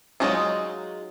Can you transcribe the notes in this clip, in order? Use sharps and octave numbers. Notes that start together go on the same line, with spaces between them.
F#3 G#3 D#4 F4